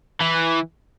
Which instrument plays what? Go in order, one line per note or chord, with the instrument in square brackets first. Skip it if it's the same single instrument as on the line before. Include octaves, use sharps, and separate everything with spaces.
[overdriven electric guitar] E3